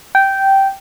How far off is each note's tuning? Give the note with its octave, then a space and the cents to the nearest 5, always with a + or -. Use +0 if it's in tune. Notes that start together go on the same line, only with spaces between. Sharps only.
G5 -10